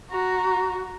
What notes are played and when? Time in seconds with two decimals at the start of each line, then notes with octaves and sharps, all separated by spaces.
0.10 F#4 A#5